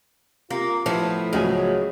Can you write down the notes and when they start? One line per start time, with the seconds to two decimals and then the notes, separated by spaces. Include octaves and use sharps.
0.51 C3 A#3 F4
0.86 A2 F3 B3 E4
1.33 C#2 A2 F#3 G#3 G#5